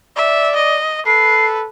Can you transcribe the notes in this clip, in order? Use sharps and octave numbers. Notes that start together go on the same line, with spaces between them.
D5 E5
D#5
A4 B4 C7